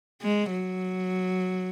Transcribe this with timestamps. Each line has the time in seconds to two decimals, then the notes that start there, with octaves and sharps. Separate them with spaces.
0.22 G#3
0.50 F#3